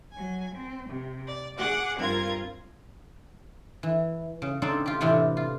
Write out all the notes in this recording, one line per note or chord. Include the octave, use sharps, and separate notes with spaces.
F#3 G#5
C4
C3
D5
G#4 F#5 D6 F#6
G2 C4 F4 A#4 G#6
E3
C#3
C#3 C4 D4 D#4 A4 C5
F4 G4
A2 C3 E3 B3 D4 F4
F4